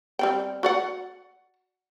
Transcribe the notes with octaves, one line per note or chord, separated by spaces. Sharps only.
G3 C4 G5
F#4 D5 F#5